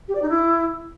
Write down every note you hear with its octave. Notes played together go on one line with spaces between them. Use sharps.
G4
D5
D#4
E4